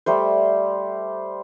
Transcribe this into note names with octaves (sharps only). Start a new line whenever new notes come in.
G3 A3 C5